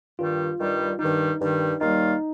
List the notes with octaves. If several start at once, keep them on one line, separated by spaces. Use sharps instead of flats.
G2 D#3 G3 F4
G2 D#3 G3
G2 D#3 G3 D#4
G2 D#3 G3
D#2 D#3 G3 A#3 D#4 F4